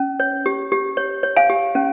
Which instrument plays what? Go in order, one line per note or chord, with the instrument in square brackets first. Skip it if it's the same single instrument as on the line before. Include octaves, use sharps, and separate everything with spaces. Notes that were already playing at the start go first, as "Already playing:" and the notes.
Already playing: [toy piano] C#4
C#5
G4
G4
C#5
C#5
F5 G#5
G4
C#4